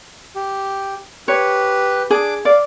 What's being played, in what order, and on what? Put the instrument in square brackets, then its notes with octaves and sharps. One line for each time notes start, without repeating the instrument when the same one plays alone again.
[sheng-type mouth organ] G4
[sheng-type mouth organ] G4 B4 [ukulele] C#5
[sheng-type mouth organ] D4 D6 [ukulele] G#4
[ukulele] D5 [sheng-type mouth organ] F5